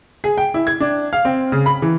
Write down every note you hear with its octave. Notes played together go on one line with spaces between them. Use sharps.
G#4
G5
E4
G#6
D4
F5
C4
C#3
B5
E3